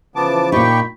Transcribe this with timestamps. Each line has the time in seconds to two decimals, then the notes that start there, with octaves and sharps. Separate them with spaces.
0.16 C#3 E3 F3 B3 A5 D6
0.52 A#2 D#4 G4 G5 B5 C#6